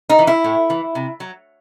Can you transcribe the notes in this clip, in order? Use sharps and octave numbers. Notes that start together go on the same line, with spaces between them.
D#4
E3
E4
A2
E3
C3
F#3